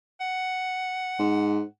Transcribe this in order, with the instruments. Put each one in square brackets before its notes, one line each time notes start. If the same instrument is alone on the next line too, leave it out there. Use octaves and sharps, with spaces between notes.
[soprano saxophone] F#5
[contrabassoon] G#2